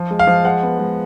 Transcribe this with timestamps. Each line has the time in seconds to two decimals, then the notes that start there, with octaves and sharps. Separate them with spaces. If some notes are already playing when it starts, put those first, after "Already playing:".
Already playing: F3
0.11 G#3
0.19 F5
0.27 F3
0.45 G#3 F#5
0.63 B3
0.79 G#3